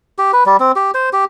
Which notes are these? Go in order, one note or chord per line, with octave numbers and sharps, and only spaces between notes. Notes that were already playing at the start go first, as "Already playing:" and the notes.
G4
B4
G3
C4
G4
C5
G4